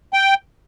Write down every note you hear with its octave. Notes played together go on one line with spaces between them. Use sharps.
G5